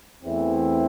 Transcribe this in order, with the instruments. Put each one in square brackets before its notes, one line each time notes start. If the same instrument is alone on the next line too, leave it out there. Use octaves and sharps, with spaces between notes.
[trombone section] E2 E3 A3 C4 E4